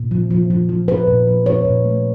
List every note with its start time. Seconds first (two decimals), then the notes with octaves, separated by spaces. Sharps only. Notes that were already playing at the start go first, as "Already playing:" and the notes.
Already playing: A#2
0.11 F3
0.31 F3
0.50 F3
0.69 F3
0.88 F3 B4
1.07 A#2
1.27 F3
1.46 F3 C#5
1.65 A#2
1.85 A3